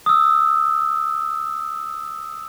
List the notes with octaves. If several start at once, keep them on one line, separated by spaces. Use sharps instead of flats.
D#6 E6